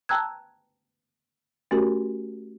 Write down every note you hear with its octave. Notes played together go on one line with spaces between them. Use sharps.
G5 A5 A#5 E6 F#6 G#6
A3 C#4 F#4 G4 A#4